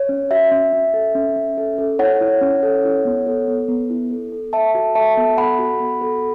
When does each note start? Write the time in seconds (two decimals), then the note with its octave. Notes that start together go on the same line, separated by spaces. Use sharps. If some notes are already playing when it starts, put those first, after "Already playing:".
Already playing: C#5
0.09 C#4
0.31 F#4 E5
0.51 C#4
0.73 C#4
0.94 A4
1.15 C#4
1.36 C#4
1.58 A4
1.78 A4
1.99 E4 C#5 F#5
2.21 E4
2.42 C#4
2.63 A4
2.84 E4
3.05 B3
3.26 A4
3.48 B3
3.68 B3
3.90 E4
4.11 A4
4.32 A4
4.53 A4 E5 A5
4.75 F#4
4.95 A4 E5 A5
5.17 B3
5.37 A4 F#5 B5
5.59 F#4
5.80 B3
6.01 A4